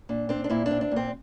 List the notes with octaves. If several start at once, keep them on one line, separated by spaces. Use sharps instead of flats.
A#2 D4
C4 D4
D4
A#2 E4
D4
C4
D4
A#2 C4